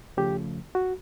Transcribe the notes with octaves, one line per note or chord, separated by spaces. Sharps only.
D#2 C#3 F3 A3 G4
F#4